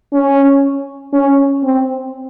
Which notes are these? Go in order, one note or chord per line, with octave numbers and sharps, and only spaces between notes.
C#4
C#4
C4